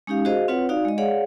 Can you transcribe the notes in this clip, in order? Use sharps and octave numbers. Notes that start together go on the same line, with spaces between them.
G#3 C#4 D#4 G4 F5
F#4 G#4 C5 D#5 F5
C4 F4 B4 C#5 F#5
D#4 F#4 D5 F5
G#3 D#5
G#4 C#5 D5 F5 F#5